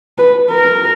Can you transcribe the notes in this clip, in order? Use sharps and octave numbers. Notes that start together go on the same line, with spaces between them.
B4
A#4